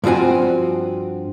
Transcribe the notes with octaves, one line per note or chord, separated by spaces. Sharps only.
G2 F3 C4 F#4 G#5